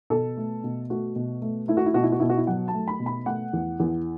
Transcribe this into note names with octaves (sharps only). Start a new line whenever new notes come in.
B2 A4
A3
B2
A3 F#4
B2
A3
A3 E4
F#4
E4
B2 F#4
E4
F#4
B2 E4
F#4
E4
F#3 F#5
A5
A3
B5
B2
B5
A3 F#5
E2
E2